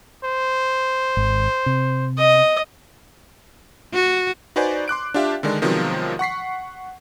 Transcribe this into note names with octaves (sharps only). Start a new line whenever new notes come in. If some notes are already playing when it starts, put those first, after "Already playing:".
C5
G#1
C3
D#5
F#4
D#4 F#4 B4 C5 D5 G#5
C6 D6 F#6 D7
D4 F4 G4 E5 F5 G5
D3 D#3 G#3 D4
C3 D#3 F3 F#3 G#3 B3
F#5 C#6 B6 C7